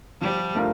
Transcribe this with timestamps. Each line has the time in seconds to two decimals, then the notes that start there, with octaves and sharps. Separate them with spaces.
0.21 F3 G3
0.55 A3 D4 F4 A#4